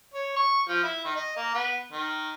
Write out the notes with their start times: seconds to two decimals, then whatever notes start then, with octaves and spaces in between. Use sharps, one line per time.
0.14 C#5
0.36 C#6
0.68 F3
0.83 E4
1.04 D#3
1.16 D#5
1.36 A#3
1.55 B3
1.92 D#3